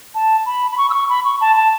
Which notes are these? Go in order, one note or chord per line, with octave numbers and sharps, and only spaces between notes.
A5
B5
B5
C#6
E6
C#6
B5
C#6
A5
A5